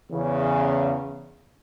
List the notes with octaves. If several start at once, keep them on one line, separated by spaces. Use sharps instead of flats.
E2 C#3